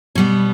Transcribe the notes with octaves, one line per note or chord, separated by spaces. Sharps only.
B2 G3 B3